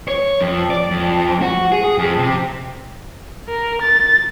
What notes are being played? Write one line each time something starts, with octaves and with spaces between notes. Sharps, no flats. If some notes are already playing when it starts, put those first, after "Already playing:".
C#5
F2
D5
F2
F#4
G#4
G#4
F2
C3
A#4
A6